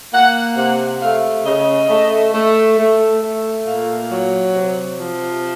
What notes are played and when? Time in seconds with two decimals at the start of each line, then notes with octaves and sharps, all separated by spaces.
0.13 A#3 F#5
0.57 C3 F#5
1.01 A3 F5
1.45 C#3 D#5
1.89 A3
2.33 A3
2.78 A3
3.21 A3
3.65 A#2 F5
4.09 F#3
4.54 C3
4.98 F3